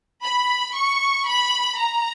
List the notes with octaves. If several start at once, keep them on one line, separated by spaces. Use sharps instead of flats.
B5
C#6
B5
A#5